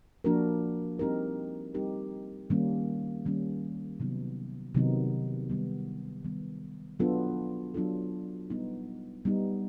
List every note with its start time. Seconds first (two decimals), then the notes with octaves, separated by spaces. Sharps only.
0.24 F3 A#3 D4 F#4 A#4
0.99 G3 C4 D#4 G4 A#4
1.74 G3 C4 D#4 G4 A#4
2.50 D#3 G3 A#3 C#4
3.26 D#3 G3 A#3 C#4
4.00 C3 D#3 F#3 B3 D#4
4.75 C3 D#3 F#3 B3 D#4
5.50 D#3 G3 B3
6.24 D#3 G3 B3
7.00 F#3 B3 D4 F4 A4
7.74 F#3 B3 D4 F4 A4
8.50 G3 B3 D#4
9.25 G3 B3 D#4